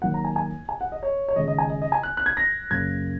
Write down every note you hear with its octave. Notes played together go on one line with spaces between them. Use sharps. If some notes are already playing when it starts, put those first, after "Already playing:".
D#2 D#3 F#3 A#3 F#5
A#5
G#5
G#5
G#5
F#5
D#5
C#5
C#5
D#2 C#3 G#3 D#5
D#5
G#5
D#5
D#5
G#5
F#6
F#6
G#6
A#6
F#2 C#3 A#3 G#6